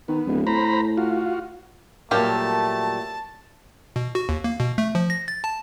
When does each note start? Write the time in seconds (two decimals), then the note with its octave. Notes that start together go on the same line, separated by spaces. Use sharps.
0.08 D#3 B3
0.26 D1
0.47 A2 C5 A#5 B5
0.97 F4 F#4
2.11 A#2 F#3 G3 A3 A#3 G4 A#4 A5
3.96 B2
4.15 F#4
4.29 D#2
4.44 A#3
4.60 B2
4.78 A3
4.95 F3
5.10 A#6
5.28 A6
5.44 A5